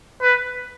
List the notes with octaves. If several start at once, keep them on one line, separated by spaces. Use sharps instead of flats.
B4